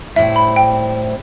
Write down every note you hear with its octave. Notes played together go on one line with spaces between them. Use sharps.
A2 G3 C4 E4 E5
B5
G5